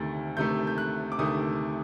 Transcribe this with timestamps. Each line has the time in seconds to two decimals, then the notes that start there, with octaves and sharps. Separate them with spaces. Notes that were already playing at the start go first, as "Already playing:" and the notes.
Already playing: D2 C3 D#3 A3 A6
0.37 D2 C3 D#3 A3 G6
0.67 G6
0.78 F#6
1.12 D6
1.18 D2 C3 D#3 A3 D#6